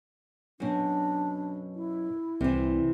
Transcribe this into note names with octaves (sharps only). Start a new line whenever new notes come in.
F#2 B2 D4
E4
C2 C3 E3